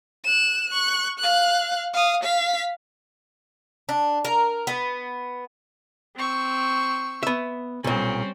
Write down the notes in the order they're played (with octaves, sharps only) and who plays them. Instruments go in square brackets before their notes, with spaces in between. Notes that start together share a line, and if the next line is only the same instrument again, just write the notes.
[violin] F#6 E7
C#6 F#6
F5 F#6
F5 D#6
F5 B6
[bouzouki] D4
A#4
B3
[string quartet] C4 C#6 E6
[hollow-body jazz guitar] B3 E5
[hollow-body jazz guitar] B1 A#2 [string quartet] G3 C4 C#4